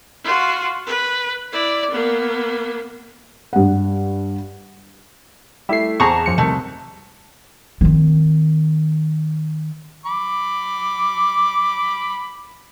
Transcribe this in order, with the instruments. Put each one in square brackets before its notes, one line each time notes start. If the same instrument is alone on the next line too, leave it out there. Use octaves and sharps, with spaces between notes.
[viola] F4 F#4
B4
E4 D5
A#3 B3
[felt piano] G2 F#5
[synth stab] G3 C7 [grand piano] A3 E4 E5
[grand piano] E2 [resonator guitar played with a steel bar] G#4 A5 [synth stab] C5 A#5 C#6
[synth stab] F#2 F3 C#7
[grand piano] C2 [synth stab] D#3 [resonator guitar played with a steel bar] A3
[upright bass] D#3 C4
[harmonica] B5 D6